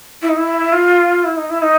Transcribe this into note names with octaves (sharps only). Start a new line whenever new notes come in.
E4
D#4
E4
F4
E4
D#4
E4
D#4